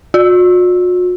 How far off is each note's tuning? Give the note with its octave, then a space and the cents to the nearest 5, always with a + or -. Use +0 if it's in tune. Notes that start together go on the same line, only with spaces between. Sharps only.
F#4 -45